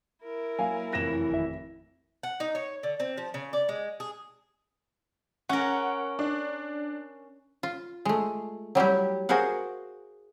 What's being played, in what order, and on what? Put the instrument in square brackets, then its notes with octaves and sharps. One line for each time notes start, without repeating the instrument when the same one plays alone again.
[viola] E4 A#4
[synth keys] F#3 [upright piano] A#3 F5 G#5
[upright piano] F1 A#6 E7 [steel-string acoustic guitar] F#2 E3
[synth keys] G#1 E5
[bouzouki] F#5
D#4
C#5
D3
C4
F3
C#3
D5
G#3
G#4
[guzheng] C#4 A#4 [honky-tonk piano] F#5
[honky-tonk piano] D4
[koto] F4
G#3 A3
F#3 G3 E4 G4
F#4 G#4 A#4 C5 F5 F#5